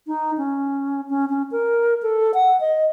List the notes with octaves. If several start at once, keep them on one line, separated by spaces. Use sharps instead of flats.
D#4
C#4
C#4
C#4
A#4
A4
F#5
D#5